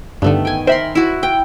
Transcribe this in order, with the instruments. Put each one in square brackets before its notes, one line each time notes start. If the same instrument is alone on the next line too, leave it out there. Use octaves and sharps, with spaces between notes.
[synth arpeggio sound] G2 D3 [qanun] D#3 A3 B3
[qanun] G5 G#5
[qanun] A#4 B5 C6 [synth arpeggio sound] C5 E5
[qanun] E4 F#4
G5